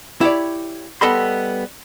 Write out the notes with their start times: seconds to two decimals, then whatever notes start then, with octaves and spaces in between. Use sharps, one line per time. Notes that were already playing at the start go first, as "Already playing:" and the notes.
0.21 E4 G4 C#5 D5
1.01 G3 B3 A4 D#5 B5 C6